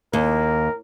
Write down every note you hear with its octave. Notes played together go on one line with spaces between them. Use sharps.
D#2 A#4